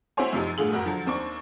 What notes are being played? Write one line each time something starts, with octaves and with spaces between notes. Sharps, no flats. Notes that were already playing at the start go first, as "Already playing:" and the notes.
C4 E4 F#4 C5 C#5 G#5
F#2 C3 F3 D#4
G1 A2 D3 F4 G#4 F#7
F#1 F2 F#4 A#4
D3 F3 F#3
D#2 C4 D4 C#6